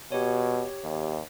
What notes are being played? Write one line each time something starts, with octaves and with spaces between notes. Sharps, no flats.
B2 G4 C#5
D#2